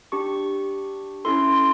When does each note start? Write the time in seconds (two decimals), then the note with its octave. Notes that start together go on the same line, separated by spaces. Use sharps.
0.12 D4 G4 C#6
1.25 C#4 E4 A4 C6
1.53 C6